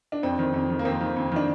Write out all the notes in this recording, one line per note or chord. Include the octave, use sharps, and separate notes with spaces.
D4
F2 C4
D#3
F2
D#3
A#3
F2 C4
D#3
F2
D#3 D4